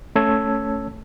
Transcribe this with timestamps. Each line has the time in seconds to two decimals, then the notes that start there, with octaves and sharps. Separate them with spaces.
0.16 A3 C#4 C#5 A5 E6 G#6